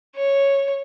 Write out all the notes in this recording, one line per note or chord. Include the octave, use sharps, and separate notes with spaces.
C#5